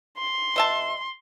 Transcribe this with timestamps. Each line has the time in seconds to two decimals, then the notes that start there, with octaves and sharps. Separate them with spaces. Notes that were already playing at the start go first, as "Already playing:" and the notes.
0.18 C6
0.56 B2 E5 A5